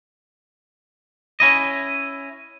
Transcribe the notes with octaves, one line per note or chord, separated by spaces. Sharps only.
C#4 E4 D#5